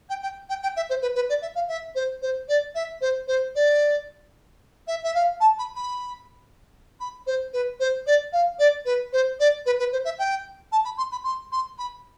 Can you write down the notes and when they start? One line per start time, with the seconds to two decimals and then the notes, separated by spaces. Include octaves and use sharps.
0.09 G5
0.22 G5
0.49 G5
0.62 G5
0.76 E5
0.89 C5
1.01 B4
1.15 B4
1.29 D5
1.41 E5
1.55 F5
1.68 E5
1.95 C5
2.22 C5
2.48 D5
2.74 E5
3.01 C5
3.27 C5
3.55 D5
4.87 E5
5.03 E5
5.14 F5
5.40 A5
5.58 B5
5.75 B5
7.00 B5
7.26 C5
7.53 B4
7.79 C5
8.06 D5
8.32 F5
8.58 D5
8.85 B4
9.12 C5
9.39 D5
9.65 B4
9.79 B4
9.92 C5
10.04 E5
10.18 G5
10.72 A5
10.84 B5
10.97 C6
11.11 B5
11.24 C6
11.51 C6
11.78 B5